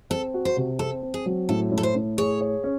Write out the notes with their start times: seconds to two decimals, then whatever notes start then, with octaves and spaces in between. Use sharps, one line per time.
0.10 C4 A4
0.34 F#4
0.45 C5
0.57 C3
0.79 C4 A4
1.02 C4
1.14 G#4
1.26 F#3
1.49 A2 A4
1.72 A2
1.78 A4
1.83 C5
1.95 A2
2.18 G#4 C#5
2.41 C#5
2.64 C#4